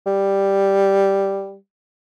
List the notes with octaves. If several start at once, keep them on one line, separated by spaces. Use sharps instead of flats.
G3